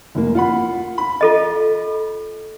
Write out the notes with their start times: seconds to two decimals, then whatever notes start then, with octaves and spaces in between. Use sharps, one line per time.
0.15 F1 A#3
0.35 F4 F#5 B5
0.98 B5
1.21 F4 A4 D#5